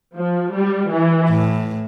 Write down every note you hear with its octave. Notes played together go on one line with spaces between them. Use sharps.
F3
G3
E3
A2